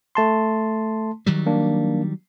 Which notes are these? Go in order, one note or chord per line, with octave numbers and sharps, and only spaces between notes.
A3 A5 C6
D#3 F#3 G3
A#3 D4